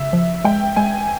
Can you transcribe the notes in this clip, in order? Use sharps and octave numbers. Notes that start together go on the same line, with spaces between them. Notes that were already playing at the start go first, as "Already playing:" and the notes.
Already playing: C#3 E5
F3
G#3 G5
G#3 G#5